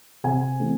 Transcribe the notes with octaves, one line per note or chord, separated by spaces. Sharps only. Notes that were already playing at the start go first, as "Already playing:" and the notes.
C3 G#5
E3 A3 C4